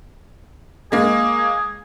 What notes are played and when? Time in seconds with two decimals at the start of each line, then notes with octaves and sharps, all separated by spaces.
0.92 G#3 A#3 G#4